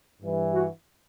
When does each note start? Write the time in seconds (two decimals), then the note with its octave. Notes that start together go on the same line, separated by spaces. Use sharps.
0.21 G2 E3
0.54 F#4